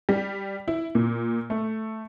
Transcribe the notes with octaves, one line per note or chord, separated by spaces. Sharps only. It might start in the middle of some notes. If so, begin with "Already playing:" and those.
G3
E4
A#2
A3